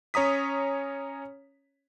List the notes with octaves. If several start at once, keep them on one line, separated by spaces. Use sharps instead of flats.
C#4 C#5 A#5 D#6 B6